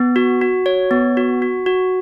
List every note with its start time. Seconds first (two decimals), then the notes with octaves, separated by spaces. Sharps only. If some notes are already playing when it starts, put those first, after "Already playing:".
Already playing: B3
0.16 F#4
0.41 F#4
0.66 C#5
0.91 B3
1.17 F#4
1.42 F#4
1.66 F#4